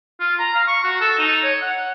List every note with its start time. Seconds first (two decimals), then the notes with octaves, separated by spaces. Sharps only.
0.20 F4
0.39 A#5
0.54 F5
0.67 C#6
0.84 F#4
1.01 A4
1.18 D#4
1.43 C#5
1.61 F#5